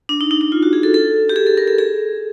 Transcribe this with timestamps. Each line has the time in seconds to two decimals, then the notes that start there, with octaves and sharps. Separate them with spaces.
0.09 D4
0.21 D#4
0.31 D#4
0.41 D#4
0.52 F4
0.63 F#4
0.73 G#4
0.83 A4
0.94 A4
1.29 G4
1.36 G#4
1.47 A4
1.57 A#4
1.67 A4
1.78 G#4